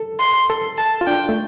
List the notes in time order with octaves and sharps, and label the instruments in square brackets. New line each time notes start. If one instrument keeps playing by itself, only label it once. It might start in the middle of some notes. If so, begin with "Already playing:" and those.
Already playing: [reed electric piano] A4
[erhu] C6
[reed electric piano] A4
[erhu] A5
[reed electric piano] F4
[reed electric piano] D4 [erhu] G5
[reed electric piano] A3